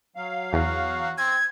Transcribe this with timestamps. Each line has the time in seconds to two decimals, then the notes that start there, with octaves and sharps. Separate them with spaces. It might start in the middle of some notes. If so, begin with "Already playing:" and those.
0.16 F#3 F5
0.53 E2 F#4
1.18 C4 G#6